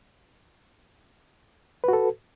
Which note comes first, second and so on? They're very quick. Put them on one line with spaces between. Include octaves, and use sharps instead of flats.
B4 F#4 A4